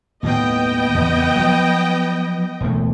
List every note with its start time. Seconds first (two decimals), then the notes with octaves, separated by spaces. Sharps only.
0.23 D#2 A2 B3 D#5 G5
0.95 E2 C#3 C4
1.35 F3 F#3
2.61 E1 D2 A3